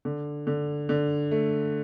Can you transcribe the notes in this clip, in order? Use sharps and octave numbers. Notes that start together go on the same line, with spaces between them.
D3
D3
D3
A3